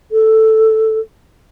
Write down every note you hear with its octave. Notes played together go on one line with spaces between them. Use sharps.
A4